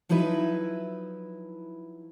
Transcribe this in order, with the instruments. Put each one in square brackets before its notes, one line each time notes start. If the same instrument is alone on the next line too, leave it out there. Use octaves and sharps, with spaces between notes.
[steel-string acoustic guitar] F3 F#3 D#4 E4 B4